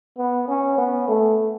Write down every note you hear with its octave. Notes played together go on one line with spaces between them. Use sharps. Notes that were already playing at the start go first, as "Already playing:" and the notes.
B3
C#4
B3
A3